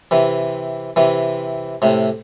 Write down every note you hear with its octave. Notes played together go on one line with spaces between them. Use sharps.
C3 E3
C3 E3
A2 C3